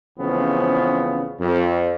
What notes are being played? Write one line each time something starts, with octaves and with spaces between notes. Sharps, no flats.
A1 C#3 F3 B3 C4
F2